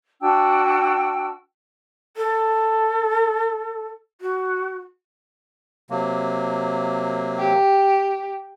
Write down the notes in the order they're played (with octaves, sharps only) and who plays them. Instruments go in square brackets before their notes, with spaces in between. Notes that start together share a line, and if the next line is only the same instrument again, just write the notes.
[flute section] D4 F#4 G5 E6
[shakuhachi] A4
F#4
[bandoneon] C3 F#3 A#3
[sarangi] G4